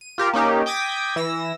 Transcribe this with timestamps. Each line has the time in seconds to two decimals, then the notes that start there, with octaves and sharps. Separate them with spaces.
0.01 D#7
0.18 F4 G4 A#4
0.33 A#3 C#4 D#4 G4
0.66 G5 D6 D#6 G#6 A#6 B6
1.16 E3 E6 A#6